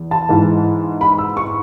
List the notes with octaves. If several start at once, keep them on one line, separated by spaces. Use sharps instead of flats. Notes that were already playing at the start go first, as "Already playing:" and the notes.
Already playing: E2
A5
G#2 E3 G#3
B5
E6
C#6